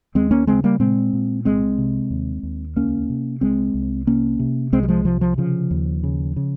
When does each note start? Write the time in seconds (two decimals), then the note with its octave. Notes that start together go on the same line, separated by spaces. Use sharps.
0.15 D#2 G#3 C4
0.31 A#3 C#4
0.47 C#3 G#3 C4
0.64 G3 A#3
0.80 A#2 G#3 C4
1.13 A#2
1.45 C2 G#3 C4
1.78 C3
2.10 D#2
2.43 D#2
2.76 C#2 A#3 C#4
3.09 C3
3.41 C2 G#3 C4
3.74 C2
4.07 C3 A#3 C#4
4.39 C3
4.72 C2 G#3 C4
4.83 G3
4.88 F3 G#3
5.05 C3 F3
5.21 F3
5.38 C#3 F3
5.71 D#2
6.03 C#3
6.36 C#3